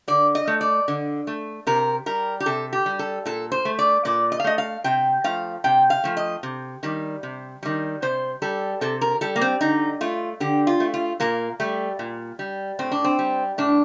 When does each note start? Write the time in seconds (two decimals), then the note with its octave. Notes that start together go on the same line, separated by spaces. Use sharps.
0.08 D3 D5
0.35 D#5
0.47 A3
0.61 D5
0.88 D3
1.27 A3
1.67 C3 A#4
2.06 G3 A#4
2.40 G4
2.46 C3 A4
2.73 G4
2.86 G3
2.99 A4
3.26 A#2 A4
3.52 C5
3.65 A3
3.79 D5
4.05 A#2 D5
4.32 D#5
4.40 F5
4.44 A3 D#5
4.58 F5
4.84 C3 G5
5.24 F3 A3 F5
5.64 C3 G5
5.90 F5
6.04 F3 A3
6.17 D#5
6.43 C3
6.83 D#3 G3
7.23 C3
7.63 D#3 G3
8.02 C3 C5
8.42 G3 A4
8.81 C3 A4
9.01 A#4
9.21 G3 A4
9.36 A#3
9.41 C4
9.61 D3 D#4
10.01 A3 F4
10.40 D3 G4
10.67 F4
10.80 A3
10.94 F4
11.20 A#2 A#3
11.60 G3 A3
11.99 A#2
12.39 G3
12.79 A2 C4
12.92 D4
13.04 C4
13.19 G3
13.58 A2 D4